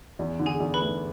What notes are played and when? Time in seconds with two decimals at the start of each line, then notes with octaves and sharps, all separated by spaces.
0.19 E2
0.39 D3
0.46 G#4 G#5
0.60 E2
0.74 B4 B5
0.80 A3